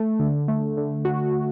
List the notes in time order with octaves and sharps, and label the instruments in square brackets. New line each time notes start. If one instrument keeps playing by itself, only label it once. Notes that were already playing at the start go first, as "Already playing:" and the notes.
Already playing: [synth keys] A3
D3
A3
D3
F#4